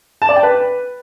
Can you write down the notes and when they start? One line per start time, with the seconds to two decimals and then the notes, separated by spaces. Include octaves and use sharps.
0.22 A5
0.29 D5
0.36 G5
0.43 B4